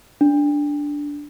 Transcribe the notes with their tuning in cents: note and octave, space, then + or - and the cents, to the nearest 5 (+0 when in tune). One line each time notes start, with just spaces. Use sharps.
D4 -5